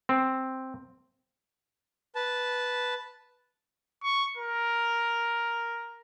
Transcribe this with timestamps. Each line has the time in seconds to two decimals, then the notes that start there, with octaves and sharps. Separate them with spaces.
0.09 C4
2.15 B4 A5
4.03 C#6
4.38 A#4